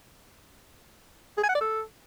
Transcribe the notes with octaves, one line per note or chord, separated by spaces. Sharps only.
G#4
G#5
F#5
D5
A4